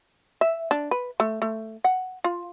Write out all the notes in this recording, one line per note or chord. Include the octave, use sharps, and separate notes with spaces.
E5
D4
B4
A3
A3
F#5
F4